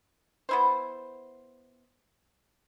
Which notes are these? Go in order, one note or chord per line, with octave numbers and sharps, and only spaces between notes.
B3 E4 C5